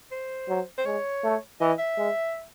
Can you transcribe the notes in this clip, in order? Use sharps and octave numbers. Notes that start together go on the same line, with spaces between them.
C5
F#3
C5
G#3 C#5
A3
E3 D#5
E5
G#3